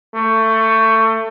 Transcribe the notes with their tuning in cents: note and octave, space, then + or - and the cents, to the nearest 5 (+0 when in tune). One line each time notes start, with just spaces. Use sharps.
A3 +20